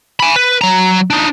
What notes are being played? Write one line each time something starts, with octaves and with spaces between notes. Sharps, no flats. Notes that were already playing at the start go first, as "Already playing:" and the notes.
G#5 B5
B4
F#3 A#5
D4 D#4